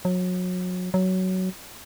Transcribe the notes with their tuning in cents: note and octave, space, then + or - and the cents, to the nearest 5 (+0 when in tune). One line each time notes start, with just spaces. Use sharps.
F#3 -30
F#3 +10